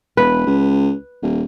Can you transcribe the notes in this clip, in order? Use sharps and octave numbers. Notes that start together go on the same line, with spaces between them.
E1 B4
C#2
D#1